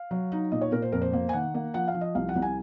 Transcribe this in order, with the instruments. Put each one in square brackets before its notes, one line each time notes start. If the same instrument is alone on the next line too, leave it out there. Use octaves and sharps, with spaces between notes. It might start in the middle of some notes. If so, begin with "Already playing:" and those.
Already playing: [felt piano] F5
F#3
D#4
A#2 D#5
C#5
A#2 A#4
C5
F2 A#4
C5
A#3
G#5
D#3 F#5
A#3
F3 F#5
F5
F3
D#5
C2 F5
F#5
C2
G#5